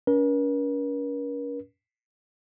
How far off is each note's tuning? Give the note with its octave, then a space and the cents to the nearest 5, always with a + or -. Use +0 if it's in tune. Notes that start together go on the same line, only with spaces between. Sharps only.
C#4 +40 A#4 +45